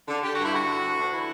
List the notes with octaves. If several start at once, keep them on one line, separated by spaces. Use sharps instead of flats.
D3
D3 G4
F#4
G2
E4
D3 F#4
D3
D2
D2 D4
E3 E4